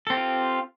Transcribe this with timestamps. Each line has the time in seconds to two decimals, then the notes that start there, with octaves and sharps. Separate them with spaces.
0.07 A4
0.10 C4
0.13 G4
0.17 F4